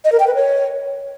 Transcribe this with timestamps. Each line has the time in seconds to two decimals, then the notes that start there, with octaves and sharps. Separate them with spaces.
0.05 D#5
0.12 A#4
0.20 G5
0.27 B4
0.35 C#5